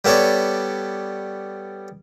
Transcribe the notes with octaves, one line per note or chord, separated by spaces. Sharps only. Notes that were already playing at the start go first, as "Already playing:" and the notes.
G3 B3 A4 C#5 D5